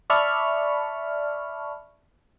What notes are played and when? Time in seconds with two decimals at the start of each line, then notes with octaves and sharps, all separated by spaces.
0.10 D5 E5 A5 B5 C#6 F6